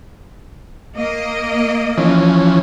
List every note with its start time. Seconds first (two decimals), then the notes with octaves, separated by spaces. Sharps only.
0.96 A#3 D#5
1.98 E3 F3 C#4